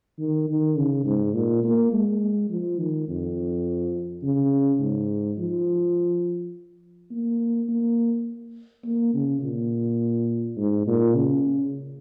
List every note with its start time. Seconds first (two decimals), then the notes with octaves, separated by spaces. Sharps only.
0.19 D#3
0.49 D#3
0.77 C#3
1.05 G#2
1.34 A#2
1.64 A#3
1.93 G#3
2.50 F3
2.79 D#3
3.08 F2
4.23 C#3
4.81 G#2
5.38 F3
7.11 A#3
7.69 A#3
8.84 A#3
9.14 C#3
9.42 A#2
10.57 G#2
10.87 A#2
11.15 C#3